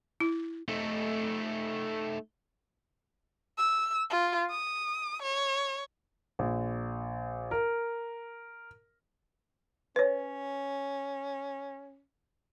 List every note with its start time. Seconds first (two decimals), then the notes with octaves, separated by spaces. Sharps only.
0.20 E4
0.69 A3 D#4
3.58 E6
4.11 F4
4.50 D#6
5.23 C#5
6.39 A#1
7.51 A#4
9.96 C#4 B4 C#5